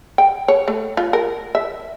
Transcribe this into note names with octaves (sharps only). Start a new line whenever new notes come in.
G5
C#5
A3
F4
A#4
E5